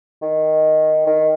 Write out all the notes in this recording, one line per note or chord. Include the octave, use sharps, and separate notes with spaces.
D#3
D#3